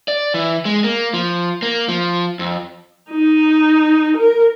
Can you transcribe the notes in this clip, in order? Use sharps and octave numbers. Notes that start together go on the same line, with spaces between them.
D5
E3
G#3
A#3
F3
A#3
F3
F2
D#4
A#4